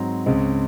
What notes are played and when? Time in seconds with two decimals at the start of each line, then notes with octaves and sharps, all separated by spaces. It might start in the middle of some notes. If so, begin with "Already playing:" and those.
Already playing: G#2 F#3 C4 A#5
0.26 C#2 C#3 G#3 C4